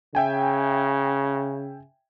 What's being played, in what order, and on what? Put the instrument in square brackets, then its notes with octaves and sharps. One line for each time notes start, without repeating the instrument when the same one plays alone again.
[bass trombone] C#3 [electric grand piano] E5 G5 G#5